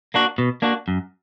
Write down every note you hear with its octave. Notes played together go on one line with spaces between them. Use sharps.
A#3 D4 F#4
B2
A#3 D4 F#4
F#2